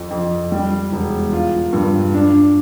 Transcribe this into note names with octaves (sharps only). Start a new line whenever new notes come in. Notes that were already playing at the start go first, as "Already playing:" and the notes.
Already playing: F2
F2
G3
E1
F4
G2
D4